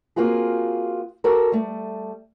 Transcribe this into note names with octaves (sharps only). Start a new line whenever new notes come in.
A#3 C4 F4 F#4 G#4
F#4 G4 A4 A#4
G3 A3